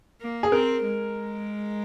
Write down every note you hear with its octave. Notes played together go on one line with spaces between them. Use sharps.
A#3
G#4
C4 A#4
G#3